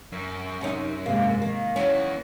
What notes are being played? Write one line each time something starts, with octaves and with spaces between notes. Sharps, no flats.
F#2
C3 C#4 D#4
G#2 C3 A#3
D#3 A#3
E3 F#3 B3 C#4